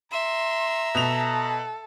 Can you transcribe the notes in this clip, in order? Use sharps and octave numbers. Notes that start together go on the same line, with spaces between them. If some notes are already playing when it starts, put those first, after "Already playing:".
E5 A#5 C6
B2 A4 F7